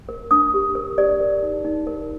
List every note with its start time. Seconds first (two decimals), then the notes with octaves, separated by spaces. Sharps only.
0.09 A#4
0.31 D4 D#6
0.54 G4
0.75 A#4
0.98 G4 D5
1.21 A#4
1.43 D#4
1.65 D#4
1.87 A#4